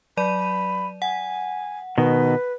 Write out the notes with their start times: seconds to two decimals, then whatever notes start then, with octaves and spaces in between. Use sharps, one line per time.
0.17 F#3 D5 B5 D#7
1.02 F#5 G#5
1.98 B2 D#3 B4